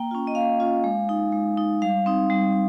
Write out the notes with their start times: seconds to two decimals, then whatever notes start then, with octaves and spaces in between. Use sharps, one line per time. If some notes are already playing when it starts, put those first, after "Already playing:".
Already playing: A#3 G5
0.11 C#4 F4
0.27 D#5
0.35 A#3 F5
0.60 C#4 F4
0.84 G#3
1.09 D#4
1.32 G#3
1.57 D#4
1.82 G3 F5
2.06 C4 D#4
2.30 G3